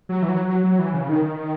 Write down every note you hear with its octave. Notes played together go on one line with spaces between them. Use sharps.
F#3
E3
F#3
F#3
F#3
E3
C#3
D#3